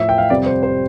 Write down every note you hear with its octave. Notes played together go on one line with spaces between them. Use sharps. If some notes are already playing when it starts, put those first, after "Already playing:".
Already playing: A2 F3 E5
G5
F5
F2 C3 G3 D5
C5
C5